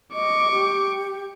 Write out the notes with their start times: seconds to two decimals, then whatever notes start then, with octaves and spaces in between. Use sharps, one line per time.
0.14 D#5 C#6 D6
0.52 G4